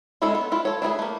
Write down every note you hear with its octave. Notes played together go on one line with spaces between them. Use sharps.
G#3 C#4 D4 E4 A4
B3
E4 F4
A4 C#5
D4 E4 G#4 B4
A3 A#3